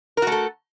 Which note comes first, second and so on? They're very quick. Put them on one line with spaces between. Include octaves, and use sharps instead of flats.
A#4 F#4 A3 A4